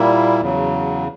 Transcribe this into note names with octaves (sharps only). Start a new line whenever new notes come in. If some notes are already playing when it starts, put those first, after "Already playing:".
Already playing: A#2 G3 A#3 E4
E2 C#3 F#3